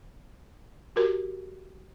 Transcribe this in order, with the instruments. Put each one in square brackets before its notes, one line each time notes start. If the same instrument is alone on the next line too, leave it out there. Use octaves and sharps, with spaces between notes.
[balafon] F#4 G4 A#4